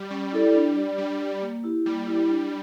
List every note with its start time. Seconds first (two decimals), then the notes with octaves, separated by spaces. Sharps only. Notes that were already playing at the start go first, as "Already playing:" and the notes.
Already playing: G3
0.11 G3 C#4
0.33 E4 A4 D5
0.54 G3 D4
0.76 G4 D5
0.98 G3 D4
1.20 G4 D5
1.42 A#3
1.64 E4 G4
1.85 G3 A#3
2.07 E4 G4
2.29 D4